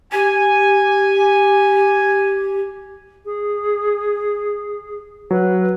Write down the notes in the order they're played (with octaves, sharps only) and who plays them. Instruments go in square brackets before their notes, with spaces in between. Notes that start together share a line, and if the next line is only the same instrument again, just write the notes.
[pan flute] G4 [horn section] G#5
[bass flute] G#4
[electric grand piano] F#3 [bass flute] B4